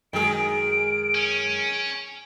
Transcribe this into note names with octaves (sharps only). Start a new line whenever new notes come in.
F#2 D#3 F#3 G#3 G#4 D7
C#4